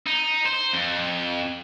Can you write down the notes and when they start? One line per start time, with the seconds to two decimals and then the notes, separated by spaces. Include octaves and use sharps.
0.07 D#4
0.45 C5
0.73 F2